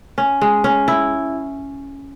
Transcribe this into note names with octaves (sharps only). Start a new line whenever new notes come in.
C#4
G#3
C#4
E4